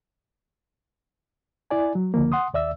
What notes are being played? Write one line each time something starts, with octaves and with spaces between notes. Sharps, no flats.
E4 D5 G#5
F#3
C#2 D3 F3 A#3
F#5 C6 D#6
D#2 D5 E5 E6